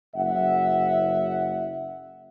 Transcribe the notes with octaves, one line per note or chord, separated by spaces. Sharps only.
F#1 E5 F#5